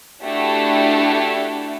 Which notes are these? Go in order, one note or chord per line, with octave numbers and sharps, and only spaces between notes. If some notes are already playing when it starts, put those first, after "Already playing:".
A3 D4 E4 F#4 G4